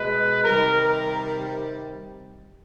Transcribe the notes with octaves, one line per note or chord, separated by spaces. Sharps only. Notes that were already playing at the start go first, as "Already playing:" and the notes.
Already playing: B2 G#3 B4
C3 D#3 G3 A#4
A#4